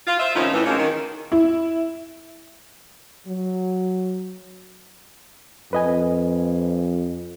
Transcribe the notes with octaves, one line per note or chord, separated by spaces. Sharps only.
F4
F4 C5 E5
A2 C3 D#3 F3 C#4 D#4
A2 E3
F3 F#3 G#3 A#3 C4 C#4
D#3
E4
F#3
F2 B4 D#5 G#5